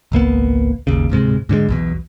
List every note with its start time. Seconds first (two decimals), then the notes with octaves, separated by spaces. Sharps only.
0.12 G#1 C#2 A#3 B3
0.87 G#1 D#2 C#3
1.10 D1 G#2 C3 G#3
1.49 G#2 D3 D#3 G#3
1.69 B1 E2 B2